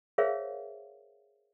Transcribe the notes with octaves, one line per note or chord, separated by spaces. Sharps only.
G#4 A#4 C5 C#5 E5 F5